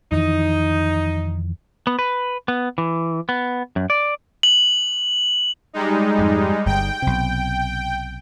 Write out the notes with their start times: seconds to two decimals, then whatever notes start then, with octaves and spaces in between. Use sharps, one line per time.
0.12 F2 D#3 E3 D#4
1.87 B3
1.99 B4
2.48 B3
2.78 E3
3.29 B3
3.76 F#2
3.90 D5
4.43 F#7
5.73 G3 G#3 D#4
6.19 F2 G#2
6.66 G1 G2 G5
7.02 B1 C3